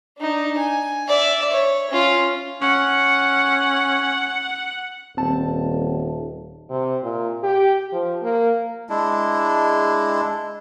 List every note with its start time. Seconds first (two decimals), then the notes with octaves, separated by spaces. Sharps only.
0.18 D4 D#4
0.58 G#5
1.08 D5 E5
1.52 C#5
1.91 C#4 F4
2.62 C#4 F#5
5.17 D#1 C4 A5
6.70 C3
7.03 A#2
7.43 G4
7.93 F3
8.23 A#3
8.89 G#3 D4 E4